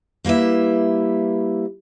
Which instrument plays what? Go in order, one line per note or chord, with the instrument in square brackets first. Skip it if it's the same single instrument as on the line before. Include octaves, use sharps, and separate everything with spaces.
[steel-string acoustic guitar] G3 A#3 E4 B4 E5